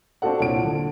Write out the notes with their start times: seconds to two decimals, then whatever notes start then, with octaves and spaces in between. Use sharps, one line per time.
0.22 C4 D4 F4 F#4 A4 F#5
0.40 C2 A#2 C#5 D7
0.64 D3